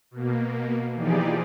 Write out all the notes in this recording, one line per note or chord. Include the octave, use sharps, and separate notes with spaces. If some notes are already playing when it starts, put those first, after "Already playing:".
B2 A#3
E3 F3 D#4 G4 G#4 D5